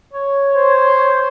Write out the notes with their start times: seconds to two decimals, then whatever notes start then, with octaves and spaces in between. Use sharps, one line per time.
0.13 C#5
0.56 C5